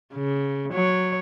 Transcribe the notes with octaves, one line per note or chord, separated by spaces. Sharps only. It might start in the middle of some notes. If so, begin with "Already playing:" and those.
C#3
F#3 C#5